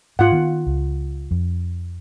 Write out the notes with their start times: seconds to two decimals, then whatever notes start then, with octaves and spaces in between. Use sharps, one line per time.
0.19 G#2 F4 F#5
0.32 D#3 B3
0.66 C#2
1.31 F2